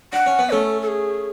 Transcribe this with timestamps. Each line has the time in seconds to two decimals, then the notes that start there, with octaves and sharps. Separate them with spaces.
0.13 D4 F#5
0.26 C#4
0.39 B3
0.51 A3 C#4 A4
0.82 A4
0.88 G#4